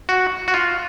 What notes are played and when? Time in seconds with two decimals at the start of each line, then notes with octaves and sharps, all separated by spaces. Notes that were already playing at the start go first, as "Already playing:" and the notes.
0.09 F#4
0.48 F#4
0.54 F4